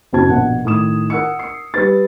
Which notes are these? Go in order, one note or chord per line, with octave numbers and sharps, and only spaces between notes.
F#1 C4 F#4 A5 G#6
A#1 B2 A#4 F#5
A2 D#3 D#6 E7
A#4 F#5 E6 C#7
C7
G3 B4 A6